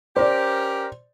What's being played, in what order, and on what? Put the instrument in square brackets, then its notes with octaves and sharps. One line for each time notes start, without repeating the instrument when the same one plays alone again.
[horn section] C#4 G4 A#4 [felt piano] C5 D5